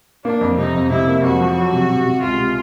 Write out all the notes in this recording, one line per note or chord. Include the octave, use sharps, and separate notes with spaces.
A#3 D4
F2
C3 D#4
F2
C3 E4
A#3
F2 F#4
F3
F#3
C3
C3
C3
C#2 F4
C3